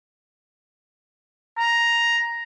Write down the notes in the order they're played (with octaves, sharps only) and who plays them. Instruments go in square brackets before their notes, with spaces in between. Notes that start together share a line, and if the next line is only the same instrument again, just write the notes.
[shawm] A#5